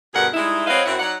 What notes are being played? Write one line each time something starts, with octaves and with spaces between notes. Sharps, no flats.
D2 G2 B2 G#4 A#4 F#5
G3 G#3 D#4 E4
F#3 C4 B4 C#5 D#5 F5
F#2 C4 E4 F#4 E5 F#5
F#3 D#4 D5 F#5